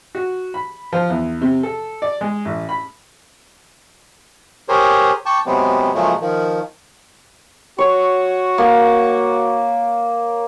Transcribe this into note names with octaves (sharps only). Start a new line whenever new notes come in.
F#4
B5
F3
E2
C3
A4
D5
G#3
A1
B5
G4 G#4 A#4 C5 C#5
G5 A5 C#6 D6
C3 F#3 G#3 B3 C4
A#2 C#3 F3 F#3 G#3 A3
D#3 F3
F#4 C#5
A#3